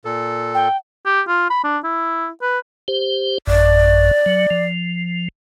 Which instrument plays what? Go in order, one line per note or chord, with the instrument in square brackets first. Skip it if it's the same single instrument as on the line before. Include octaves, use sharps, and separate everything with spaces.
[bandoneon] A#2 A4
[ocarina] G5
[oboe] G4
F4
B5
D4
E4
B4
[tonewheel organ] G4 C5
[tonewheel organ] A1 F#2 [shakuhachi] D5
[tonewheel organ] F#3
F3